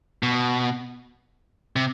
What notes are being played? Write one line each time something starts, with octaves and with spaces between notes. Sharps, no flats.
B2
C3